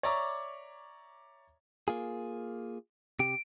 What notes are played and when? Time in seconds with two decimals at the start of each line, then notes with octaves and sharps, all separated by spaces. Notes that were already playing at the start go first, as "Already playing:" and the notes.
0.03 C#5 D5 E5 A#5 C#6 D6
1.88 A#3 F4 G#4
3.19 C3 G4 D7